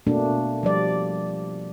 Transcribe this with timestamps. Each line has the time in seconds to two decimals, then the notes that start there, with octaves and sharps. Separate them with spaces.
0.07 B2 A3 A#3 D4 F#4
0.63 F3 G3 D5